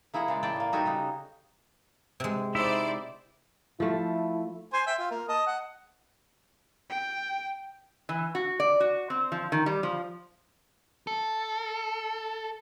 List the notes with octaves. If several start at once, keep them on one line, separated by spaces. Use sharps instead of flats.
A#3 E4 G#4 D#5 F#5
C#3 G#3 D5
E4 D5 G5 A5
A2 A#3
G3 D#4 F#4 G4 A4 G#5
C#3 D#4
C3 G#3
D#4 E4 C5 D5 E5
F3 A3 E4
C5 G#5 C6
E5 G5
F4
A#3 A#4
D#5 A5 D#6
F#5
G5
E3
F#4
D5
F#4
C4
F3
D#3
G3
F3
A4